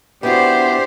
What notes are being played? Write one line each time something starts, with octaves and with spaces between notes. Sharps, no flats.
B3 D4 E4 F#4 G4 C5